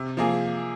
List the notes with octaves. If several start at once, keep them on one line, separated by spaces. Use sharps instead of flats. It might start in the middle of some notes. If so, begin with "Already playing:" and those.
Already playing: C3
F3 A#3 G#4